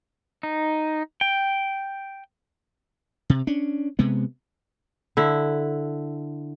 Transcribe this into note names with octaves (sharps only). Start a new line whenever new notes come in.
D#4
G5
C3
C#4 D4
C3 G#3 B3
D3 E4